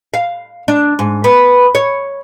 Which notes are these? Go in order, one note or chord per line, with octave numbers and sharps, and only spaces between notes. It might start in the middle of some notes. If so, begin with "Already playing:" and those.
F5
D4
G#2
B3
C#5